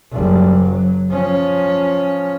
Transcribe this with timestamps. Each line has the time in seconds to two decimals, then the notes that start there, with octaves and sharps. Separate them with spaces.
0.13 F#1 G3
0.58 F#3
1.11 F3 C#4